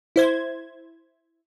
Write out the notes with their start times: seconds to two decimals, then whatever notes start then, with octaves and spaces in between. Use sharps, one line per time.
0.16 E4 C5 G#6